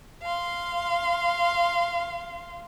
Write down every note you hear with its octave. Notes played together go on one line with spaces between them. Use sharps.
F5 C6